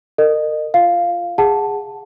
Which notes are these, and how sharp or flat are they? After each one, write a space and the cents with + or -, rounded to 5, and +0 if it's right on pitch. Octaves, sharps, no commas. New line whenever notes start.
A#4 -30 D#5 -30
F4 -10 F5 +0
G#4 -15 F#5 +0 A5 +0